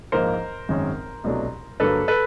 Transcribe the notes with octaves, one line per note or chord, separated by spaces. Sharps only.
A#1 G#2 F3 A#3 A#4 C5
G#1 F#2 D#3 G#3 C#4
C2 B2 F#3 A3 D4
G2 D3 F#3 A#3 A4 B4
A4 B4